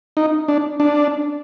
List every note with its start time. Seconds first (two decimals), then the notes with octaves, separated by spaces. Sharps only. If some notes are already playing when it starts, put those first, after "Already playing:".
0.17 D#4
0.48 D4
0.80 D4